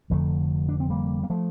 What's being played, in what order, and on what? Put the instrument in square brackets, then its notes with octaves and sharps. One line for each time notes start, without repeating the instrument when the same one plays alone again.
[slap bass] F1 F2 D3 F3 A3
D4
C4
G3 A#3
A#3
F3 A3